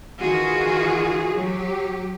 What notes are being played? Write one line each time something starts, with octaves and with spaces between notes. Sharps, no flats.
D#3 E3 F4 F#4 G#4
F#3 G4